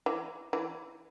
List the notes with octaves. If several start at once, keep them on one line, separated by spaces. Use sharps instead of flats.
E3
E3